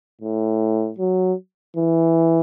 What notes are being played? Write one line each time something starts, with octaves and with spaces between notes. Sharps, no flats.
A2
F#3
E3